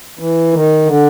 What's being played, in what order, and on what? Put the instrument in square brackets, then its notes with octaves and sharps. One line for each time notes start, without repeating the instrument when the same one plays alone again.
[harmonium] E3
D#3
D3